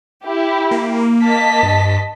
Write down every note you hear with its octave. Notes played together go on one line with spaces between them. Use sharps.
E4 G4
A#3
D#5 A5 B6
G2